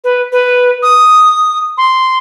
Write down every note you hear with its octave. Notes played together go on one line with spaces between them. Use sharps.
B4
B4
D#6
C6